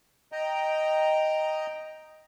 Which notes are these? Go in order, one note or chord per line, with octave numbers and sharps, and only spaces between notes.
D#5 G5 A#5